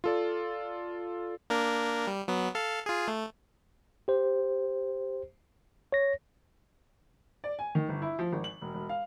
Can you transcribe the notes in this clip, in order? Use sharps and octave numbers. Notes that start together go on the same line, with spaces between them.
F4 A4 D5
A#3 D4 A#4
G3
F#3 B3
A4 F5
F4 G#4
A3
G4 C5
C#5 A#6
D5
G#5
D#3
G1
E4
F3
G#1
F#7
E1
E1
F5